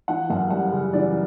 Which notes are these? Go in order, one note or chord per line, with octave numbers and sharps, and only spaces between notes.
E3 F#5
F#2 F#5
G3 F#5
C#3
E3 D5